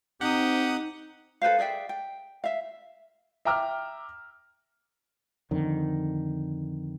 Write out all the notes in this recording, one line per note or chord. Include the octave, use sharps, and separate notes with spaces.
C4 D#4 G4 F#5 D#6
A4 B4 C5 F5
G#4 D5 E5 G5
G5
E5 F5
E5 G5 A#5 D6 E6 F6
F2 D3 D#3